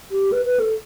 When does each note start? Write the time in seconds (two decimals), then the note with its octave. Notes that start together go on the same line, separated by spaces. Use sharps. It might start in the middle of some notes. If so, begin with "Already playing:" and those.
0.11 G4
0.32 B4
0.46 B4
0.60 A4